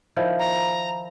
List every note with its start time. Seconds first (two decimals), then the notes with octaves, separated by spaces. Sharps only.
0.16 D#3 F3 E4
0.39 A#5